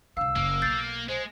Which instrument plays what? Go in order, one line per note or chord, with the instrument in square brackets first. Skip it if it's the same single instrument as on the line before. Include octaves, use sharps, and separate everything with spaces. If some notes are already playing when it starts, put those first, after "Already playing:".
[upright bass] C2 D3 [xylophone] F5 [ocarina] E6
[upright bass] F#1 [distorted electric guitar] A#3
[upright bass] B1 [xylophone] G6 A6 C7
[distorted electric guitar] G#3 [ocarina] C5